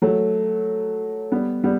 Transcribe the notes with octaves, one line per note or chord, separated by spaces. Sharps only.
F#3 A3
G3 B3
G3 B3